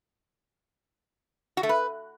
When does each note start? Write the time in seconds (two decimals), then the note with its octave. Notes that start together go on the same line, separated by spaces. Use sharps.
1.57 F#4
1.63 A3
1.69 B4